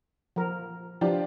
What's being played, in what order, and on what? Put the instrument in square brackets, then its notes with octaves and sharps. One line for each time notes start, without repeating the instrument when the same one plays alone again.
[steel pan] F3 A#4
[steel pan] F3 [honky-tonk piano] D4 F4 G4